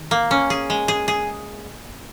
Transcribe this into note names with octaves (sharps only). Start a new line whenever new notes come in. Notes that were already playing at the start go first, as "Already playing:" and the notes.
Already playing: D#3
A#3
C#4
G#4
G#3
G#4
G#4